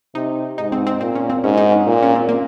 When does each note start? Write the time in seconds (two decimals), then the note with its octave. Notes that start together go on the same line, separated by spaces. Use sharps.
0.15 C3 D#4
0.58 G#2 D#4
0.72 C4
0.87 C4
1.01 A#2 C4
1.15 C#4
1.30 C4
1.44 G#2 C#4
1.57 D#4
1.72 C#4
1.87 A#2
2.03 C#4
2.16 C4
2.29 A#3